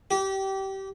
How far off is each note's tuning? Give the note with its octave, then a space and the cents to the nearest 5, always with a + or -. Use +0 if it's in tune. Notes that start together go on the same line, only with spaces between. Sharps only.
G4 -25